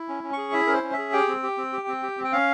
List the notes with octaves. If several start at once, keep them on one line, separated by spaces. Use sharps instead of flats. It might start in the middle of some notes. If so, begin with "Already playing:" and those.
Already playing: E4
C#4
C#4
G#4 C#6
E4 E5
C#4 A#4
C5
C#4
E5
G#4
G4 G5
C4
G4
C4
G4
C4
G4
C4
G5
C#4 F5